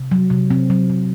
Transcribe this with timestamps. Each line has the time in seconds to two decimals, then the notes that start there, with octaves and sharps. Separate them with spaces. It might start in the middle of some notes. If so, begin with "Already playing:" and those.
Already playing: C3
0.11 F#3
0.30 C3
0.51 C3 C4
0.70 F#3
0.90 C3